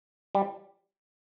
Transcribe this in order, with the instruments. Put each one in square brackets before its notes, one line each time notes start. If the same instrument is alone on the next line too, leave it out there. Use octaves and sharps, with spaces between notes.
[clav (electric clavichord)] G3